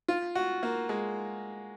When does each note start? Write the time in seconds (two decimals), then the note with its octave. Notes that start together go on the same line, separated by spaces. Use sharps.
0.08 F4
0.35 F#4
0.63 A#3
0.89 G#3